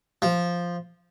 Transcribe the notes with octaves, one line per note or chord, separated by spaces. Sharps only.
F3